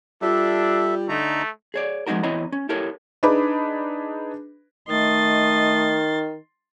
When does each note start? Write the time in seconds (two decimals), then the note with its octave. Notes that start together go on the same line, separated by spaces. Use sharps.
0.22 G3 D4 F4 A4 E5
1.08 D3 A3 D#4 A#5
1.74 G#4 C#5 D5
2.07 F3 G#3 C4 D#4 F#4 A#4
2.23 E2 C4 E4 C#5 D#5 A#5
2.52 C#4
2.69 E4 G4 A4 A#4 C#5
3.23 D4 D#4 G#4 B4 B5 D6
4.89 D#3 A3 D#5 C6 A6